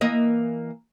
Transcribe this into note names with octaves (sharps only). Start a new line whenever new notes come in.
E3 A#3 D#5